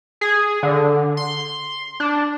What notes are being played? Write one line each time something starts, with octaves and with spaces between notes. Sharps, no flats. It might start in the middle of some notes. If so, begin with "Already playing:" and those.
G#4
D3
C6
D4